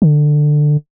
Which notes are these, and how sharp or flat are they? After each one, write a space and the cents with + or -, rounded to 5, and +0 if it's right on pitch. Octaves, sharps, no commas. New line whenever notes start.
D3 +15